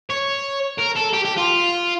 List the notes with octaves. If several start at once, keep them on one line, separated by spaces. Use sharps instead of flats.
C#5
A#4
A4
G4
G4
F4